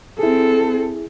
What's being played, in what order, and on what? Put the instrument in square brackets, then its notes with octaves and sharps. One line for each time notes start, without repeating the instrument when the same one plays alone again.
[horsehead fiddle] C4 A4 [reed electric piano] E4 G#4